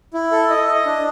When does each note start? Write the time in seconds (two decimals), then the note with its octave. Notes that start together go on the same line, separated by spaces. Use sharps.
0.14 E4
0.31 A4
0.50 D#5
0.68 D#5
0.86 D4